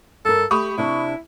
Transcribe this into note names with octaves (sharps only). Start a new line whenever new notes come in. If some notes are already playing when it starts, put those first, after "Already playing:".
G2 A4 A#4
A3 G4 B5 C#6 D#6
C3 D4 E4 A5